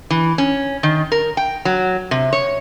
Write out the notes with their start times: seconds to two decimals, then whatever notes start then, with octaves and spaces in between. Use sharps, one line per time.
0.10 E3
0.38 C#4
0.83 D#3
1.12 A#4
1.37 G5
1.65 F#3
2.11 C3
2.33 C#5